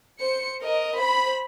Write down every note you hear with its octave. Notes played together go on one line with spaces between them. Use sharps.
C5 C#7
A#4 D#5
C5 B5